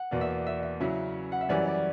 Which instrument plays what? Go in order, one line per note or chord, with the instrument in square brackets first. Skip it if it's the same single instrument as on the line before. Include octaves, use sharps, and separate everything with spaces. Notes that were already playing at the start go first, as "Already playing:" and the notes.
Already playing: [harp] F#5
[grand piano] E2 B2 A#3 [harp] D5
[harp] E5
D5
E5
E5
[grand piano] C#3 F#3 C#4 E4
[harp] F#5
E5
[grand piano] F#2 E3 G3 C#4 [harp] D5
[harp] D5